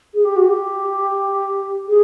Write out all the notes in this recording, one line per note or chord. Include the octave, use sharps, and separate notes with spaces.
G#4
G4
F#4
G4
G#4